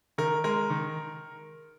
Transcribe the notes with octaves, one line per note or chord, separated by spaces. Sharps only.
D#3 A#4
G#3 A#4
D#3